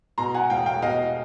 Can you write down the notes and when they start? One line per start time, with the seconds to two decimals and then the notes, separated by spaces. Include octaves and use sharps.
0.18 B2 A#5 C6
0.34 F#5 G#5
0.50 E1 F5 G5
0.66 F5 G5
0.82 B2 D#5 F5